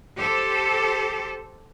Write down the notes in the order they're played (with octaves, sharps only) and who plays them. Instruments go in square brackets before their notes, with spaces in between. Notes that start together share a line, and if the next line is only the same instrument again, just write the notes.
[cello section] G4 A4 C5